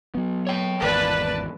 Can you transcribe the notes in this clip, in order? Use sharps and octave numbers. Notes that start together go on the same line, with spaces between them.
F#3 B3
C#5 G5
G#1 E2 A#4 B4 D5 A5